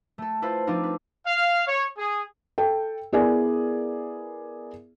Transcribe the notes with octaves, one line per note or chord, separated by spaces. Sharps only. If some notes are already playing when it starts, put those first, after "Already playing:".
A3 A4
E4 F4 A4 B4 C5
F3 C4 D4 D#4 F4
B4
F5
C#5
G#4
A4 G5
B3 E4 G#4 A#4 D5 G#5